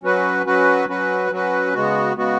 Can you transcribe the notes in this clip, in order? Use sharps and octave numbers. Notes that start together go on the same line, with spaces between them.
F#3 C#4 F#4 B4
F#3 C#4 F#4 B4
F#3 C#4 F#4 B4
F#3 C#4 F#4 B4
C#3 G#3 B3 F#4
C#3 G#3 B3 F#4